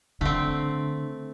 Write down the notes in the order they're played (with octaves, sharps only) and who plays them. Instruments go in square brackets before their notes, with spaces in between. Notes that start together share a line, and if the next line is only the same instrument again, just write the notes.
[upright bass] D3 [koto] A3 C4